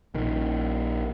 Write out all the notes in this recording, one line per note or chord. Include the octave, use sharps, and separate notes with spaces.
A#1 D#3